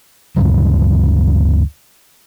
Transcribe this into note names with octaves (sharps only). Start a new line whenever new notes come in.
D2 G2 C#3 F#3